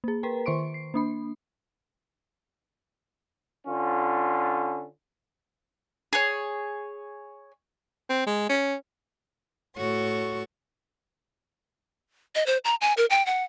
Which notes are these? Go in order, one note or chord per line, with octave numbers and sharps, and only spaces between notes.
A#3 G#4
A#4 B4 G5 A#5
D#3 C5 C6 C#6 D7
C7
A#3 D4 B5
D3 C#4 F4
G#4 C#5
C4
G#3
C#4
A2 F#4 A4 C#5 C#6
D#5
C5
A#5
G#5
A#4
G5
F#5